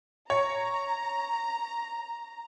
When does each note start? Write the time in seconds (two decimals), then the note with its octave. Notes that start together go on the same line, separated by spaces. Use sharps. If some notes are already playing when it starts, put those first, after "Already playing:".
0.30 C#5 A#5